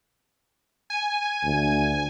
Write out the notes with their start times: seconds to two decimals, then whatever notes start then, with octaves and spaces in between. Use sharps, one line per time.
0.90 G#5
1.44 D2